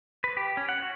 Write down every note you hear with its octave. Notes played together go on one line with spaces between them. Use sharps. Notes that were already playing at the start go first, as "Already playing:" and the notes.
B4
G4
C#4
F#5
F#4